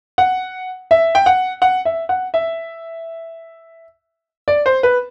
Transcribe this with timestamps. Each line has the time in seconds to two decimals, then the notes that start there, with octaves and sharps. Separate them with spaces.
0.18 F#5
0.91 E5
1.15 G5
1.26 F#5
1.62 F#5
1.85 E5
2.09 F#5
2.34 E5
4.48 D5
4.66 C5
4.83 B4